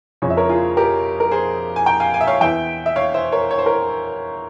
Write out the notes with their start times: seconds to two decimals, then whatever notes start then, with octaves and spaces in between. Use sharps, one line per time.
0.22 F2 C#3 F3 C#5
0.30 E5
0.37 A#4 C#5
0.49 F4 G#4
0.77 G4 A#4
1.20 A#4
1.31 G#4 C5
1.76 G#5
1.86 G5 A#5
2.00 F5 G#5
2.14 F5 G#5
2.21 E5
2.27 C#5 F5
2.41 E2 E3 E5 G5
2.86 E5
2.96 C#5 F5
3.14 C5 E5
3.32 A#4 C#5
3.51 C#5
3.59 C5
3.66 A#4 C#5